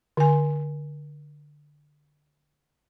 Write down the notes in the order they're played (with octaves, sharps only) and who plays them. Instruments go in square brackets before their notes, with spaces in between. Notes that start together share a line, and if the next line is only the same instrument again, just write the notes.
[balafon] D3 G#5